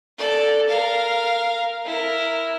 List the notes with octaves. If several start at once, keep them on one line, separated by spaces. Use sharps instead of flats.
A4 D5
A#4 F5
E4 A#4